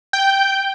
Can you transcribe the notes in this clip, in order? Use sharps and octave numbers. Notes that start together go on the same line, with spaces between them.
G5